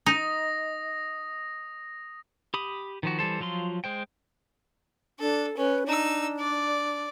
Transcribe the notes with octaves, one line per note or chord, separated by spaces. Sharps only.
D#4 D#6 A#6
G4 B5 D#6
D#3 F3 F#4
E3 G3 A4 C5
F3 F#3 F4 C6
G#3 C5 G5
D4 A4
C#4 B4
D4 D#4 E6
D5